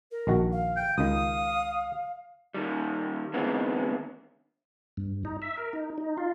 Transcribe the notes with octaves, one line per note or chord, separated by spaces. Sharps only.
A#4
A#1 D#3 F#4
F5
G5
C#2 D#3 F5 D#6
D#2 D#3 G3
D#2 D3 E3 G#3 B3 C4
G2
D#4
E5
A#4
D#4
D#4
F4